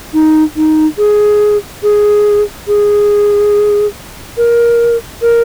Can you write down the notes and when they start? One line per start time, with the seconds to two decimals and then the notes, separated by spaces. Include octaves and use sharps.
0.14 D#4
0.56 D#4
0.98 G#4
1.83 G#4
2.68 G#4
4.37 A#4
5.22 A#4